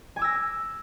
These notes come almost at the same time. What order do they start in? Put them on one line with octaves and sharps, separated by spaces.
G#5 D6 E6 A#6